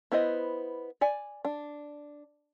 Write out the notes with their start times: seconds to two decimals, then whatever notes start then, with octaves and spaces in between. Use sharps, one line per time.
0.12 B3 E4 C5 D#5
1.01 D5 G#5
1.45 D4